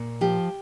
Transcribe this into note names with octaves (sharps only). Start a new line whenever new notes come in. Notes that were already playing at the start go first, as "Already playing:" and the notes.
Already playing: A#2
F3 G4